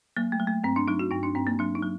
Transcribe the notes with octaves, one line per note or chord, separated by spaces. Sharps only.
F#3 A#3
A3
F#3
A3
G2 C4
D4
F#3 D#4
F#4
G2 D#4
D4
G2 C4
A#3
F#3 D4
D#4
F#3